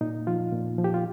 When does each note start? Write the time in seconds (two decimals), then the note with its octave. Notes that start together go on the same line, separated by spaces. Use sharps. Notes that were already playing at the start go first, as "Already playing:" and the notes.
0.01 A#2 D#4
0.27 F3 F4
0.52 A#2
0.78 F3
0.84 G4
0.94 F4